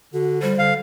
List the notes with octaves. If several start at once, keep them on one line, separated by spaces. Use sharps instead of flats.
D3 F#4
G3 C5
D3 F5